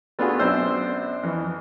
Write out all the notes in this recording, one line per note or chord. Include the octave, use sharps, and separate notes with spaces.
A3 B3 D4 F4 F#4 G#4
F#2 B2 C4 D4 C5 E6
F2 E3